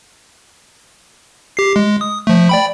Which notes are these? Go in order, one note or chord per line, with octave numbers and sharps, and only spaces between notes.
G4 C7
G#3
D#6
F3 A3
D5 G5 B5